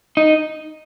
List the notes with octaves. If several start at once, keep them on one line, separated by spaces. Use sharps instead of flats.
D#4